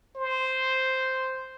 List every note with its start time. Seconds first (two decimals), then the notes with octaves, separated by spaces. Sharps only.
0.16 C5